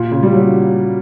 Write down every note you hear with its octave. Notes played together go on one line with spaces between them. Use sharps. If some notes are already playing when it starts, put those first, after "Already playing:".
Already playing: A#2
C#3
G3
F#3